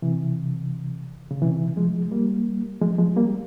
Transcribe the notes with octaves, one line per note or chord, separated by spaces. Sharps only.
C3 E3
C#3
C3 E3
F3 G#3
G3 A#3
F3 G#3
F3 G#3
G3 A#3